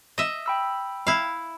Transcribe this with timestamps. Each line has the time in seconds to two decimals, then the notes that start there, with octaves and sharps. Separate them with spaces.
0.18 D#5 E5
0.46 G5 B5 E6
1.07 E4 F5